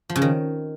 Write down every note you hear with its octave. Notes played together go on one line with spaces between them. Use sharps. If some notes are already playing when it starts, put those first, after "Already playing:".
F3
C#3
D#3